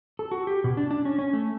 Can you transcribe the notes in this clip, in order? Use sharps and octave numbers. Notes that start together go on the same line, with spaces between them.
A4
F#4
G4
B2
D4
D4
C#4
C#4
A3